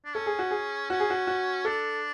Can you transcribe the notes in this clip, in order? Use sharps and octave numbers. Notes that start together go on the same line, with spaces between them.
D4
C#4 A4
G#4
F#4
G#4
C#4 F#4
G#4
F#4
F#4
D4 A4